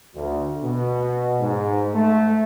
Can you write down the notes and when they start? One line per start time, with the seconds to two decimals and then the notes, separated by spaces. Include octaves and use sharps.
0.14 D2
0.62 B2
1.40 G#2
1.94 A3